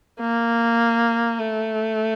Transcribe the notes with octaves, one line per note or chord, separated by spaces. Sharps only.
A#3
A3